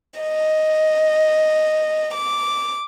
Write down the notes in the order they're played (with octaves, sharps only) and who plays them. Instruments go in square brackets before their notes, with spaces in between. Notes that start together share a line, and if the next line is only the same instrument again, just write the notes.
[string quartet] D#5
D6